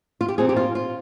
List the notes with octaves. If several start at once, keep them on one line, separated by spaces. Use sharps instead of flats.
F4
G4
A#2 F3 C4 D#4 G#4
G4
F4
F4